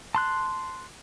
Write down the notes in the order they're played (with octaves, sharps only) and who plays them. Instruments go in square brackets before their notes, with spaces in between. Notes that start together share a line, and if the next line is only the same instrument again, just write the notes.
[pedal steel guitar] A5 C6 F#6